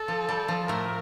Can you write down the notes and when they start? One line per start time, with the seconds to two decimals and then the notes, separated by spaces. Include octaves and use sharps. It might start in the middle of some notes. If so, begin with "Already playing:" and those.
Already playing: A4
0.08 F3
0.29 G3
0.48 F3
0.68 A2 A3 A#4